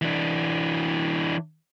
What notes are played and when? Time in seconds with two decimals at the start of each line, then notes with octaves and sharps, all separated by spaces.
0.02 E3 D4